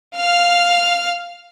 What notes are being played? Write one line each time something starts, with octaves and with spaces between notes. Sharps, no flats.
F5 F6